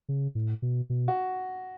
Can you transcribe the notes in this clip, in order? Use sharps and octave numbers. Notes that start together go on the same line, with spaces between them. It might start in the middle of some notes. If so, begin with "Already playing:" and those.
C#3
A2
B2
B2
F#4